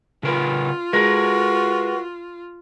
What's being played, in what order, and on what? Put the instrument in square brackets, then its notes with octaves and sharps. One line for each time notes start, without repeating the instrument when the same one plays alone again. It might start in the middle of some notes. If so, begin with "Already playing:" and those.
[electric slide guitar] C#3 A#4 B4 [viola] F4
[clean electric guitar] G#3 [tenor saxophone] F#4 [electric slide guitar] A#4 B4